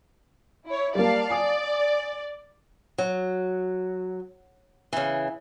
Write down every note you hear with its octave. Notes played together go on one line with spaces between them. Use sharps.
E4 C#5
G3 A#3 D5 F5 A5
D5 G#5 D#6
F#3
C#3 E3